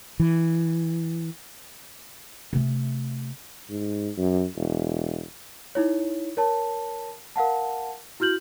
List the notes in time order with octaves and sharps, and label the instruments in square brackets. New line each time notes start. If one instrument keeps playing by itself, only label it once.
[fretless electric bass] E3
[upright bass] C3 A3
[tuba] G#2
F#2
E1
[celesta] D#4 E4 C#5
A#4 C#5 A5
A#4 F5 F#5 A5
E4 F#4 F6 G6 F#7